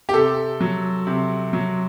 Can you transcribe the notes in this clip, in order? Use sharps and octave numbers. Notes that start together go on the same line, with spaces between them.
G4
C3 A4
F#3
C3
F#3